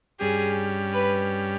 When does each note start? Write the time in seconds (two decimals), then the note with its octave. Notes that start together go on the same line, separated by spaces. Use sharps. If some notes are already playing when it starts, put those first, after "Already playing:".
0.19 G2 G3 C#4 G4 G#4
0.93 B4